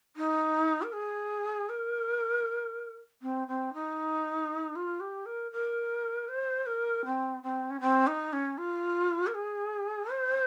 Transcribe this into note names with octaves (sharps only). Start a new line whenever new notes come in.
D#4
A#4
G#4
A#4
C4
C4
D#4
F4
G4
A#4
A#4
C5
A#4
C4
C4
C#4
C4
D#4
C#4
F4
A#4
G#4
C5